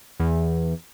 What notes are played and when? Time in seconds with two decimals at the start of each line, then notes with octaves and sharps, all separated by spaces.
0.20 E2